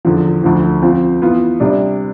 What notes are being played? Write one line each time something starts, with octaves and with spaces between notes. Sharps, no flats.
E2 D3 F3
D2 D3 F3
F3 C4 F4
E3 B3 F4
C3 G3 D4